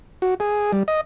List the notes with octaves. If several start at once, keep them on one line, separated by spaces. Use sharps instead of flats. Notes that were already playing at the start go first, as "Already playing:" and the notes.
F#4
G#4
G3
D#5